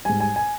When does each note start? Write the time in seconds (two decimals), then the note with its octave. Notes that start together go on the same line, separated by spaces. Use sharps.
0.05 G#2 G3 G#5
0.20 G#5
0.36 G#5